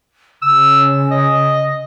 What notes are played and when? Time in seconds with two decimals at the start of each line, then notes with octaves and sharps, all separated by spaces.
0.42 C#3 E6
1.11 D#5